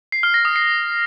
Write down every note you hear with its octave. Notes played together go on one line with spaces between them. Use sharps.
C7
F6
A#6
D#6
C7